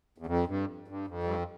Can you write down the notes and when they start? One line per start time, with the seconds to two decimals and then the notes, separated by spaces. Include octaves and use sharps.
0.18 E2
0.26 F2
0.47 G2
0.88 G2
1.07 F2
1.23 G2